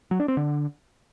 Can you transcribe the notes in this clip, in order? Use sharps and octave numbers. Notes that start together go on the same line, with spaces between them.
F#3
D4
C4
D3